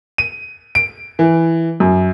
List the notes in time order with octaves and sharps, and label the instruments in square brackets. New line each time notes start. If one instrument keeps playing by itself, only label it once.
[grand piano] D#7
D7
E3
F#2